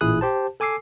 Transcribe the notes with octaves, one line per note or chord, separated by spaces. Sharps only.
A1 A#2 E4 G#4 D#6 F#6
G4 C5 A5
A4 G#5 D6 E6 C7